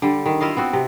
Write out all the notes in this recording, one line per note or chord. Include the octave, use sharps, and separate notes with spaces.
D3 G3
D#3
E4 F4 D#5 F5
B3 C4 F#4
C3